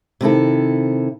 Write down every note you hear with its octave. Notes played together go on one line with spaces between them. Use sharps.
C3 D#3 E4 A4